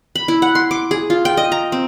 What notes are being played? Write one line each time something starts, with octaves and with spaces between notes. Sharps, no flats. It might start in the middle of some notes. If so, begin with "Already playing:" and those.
B5
E4
F#5
C6
D6
G#4
F4
G5
D#5
A#5
C4